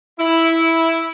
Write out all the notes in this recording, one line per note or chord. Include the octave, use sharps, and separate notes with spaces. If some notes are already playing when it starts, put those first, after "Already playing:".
E4